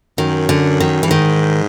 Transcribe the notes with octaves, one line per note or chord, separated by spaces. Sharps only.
F#2 D#3
D3
D#3
E3
G2
G#2 D#3